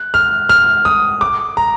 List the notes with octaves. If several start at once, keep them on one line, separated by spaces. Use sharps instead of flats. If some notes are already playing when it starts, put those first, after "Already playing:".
Already playing: F#6
F6
F6
D#6
D6
A#5